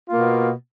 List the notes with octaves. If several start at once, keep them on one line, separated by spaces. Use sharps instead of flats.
B2 A#3 F4